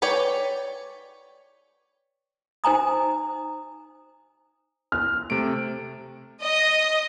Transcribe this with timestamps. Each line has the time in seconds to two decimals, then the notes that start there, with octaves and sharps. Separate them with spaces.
0.02 B4 C#5 D5 G5 G#5
2.64 D#4 C5 G#5 A#5 D#6
4.92 F6
5.30 C3 A3 D7
6.43 D#5